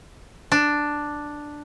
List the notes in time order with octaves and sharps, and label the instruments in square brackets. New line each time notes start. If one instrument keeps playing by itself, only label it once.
[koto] D4